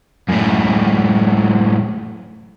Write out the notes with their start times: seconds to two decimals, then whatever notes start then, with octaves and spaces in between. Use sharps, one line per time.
0.29 F#2 A2